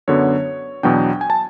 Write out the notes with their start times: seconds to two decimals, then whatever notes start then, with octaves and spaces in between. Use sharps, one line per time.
0.08 F#2 D3 F#3 B3 C#5
0.83 E2 B2 F#3 B3 D4 G5
1.21 G#5
1.30 A5